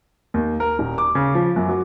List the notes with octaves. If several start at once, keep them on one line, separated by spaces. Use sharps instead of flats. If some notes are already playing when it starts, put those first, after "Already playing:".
D#2
A#4
D#1
D6
C#3
F3
F#2
F#3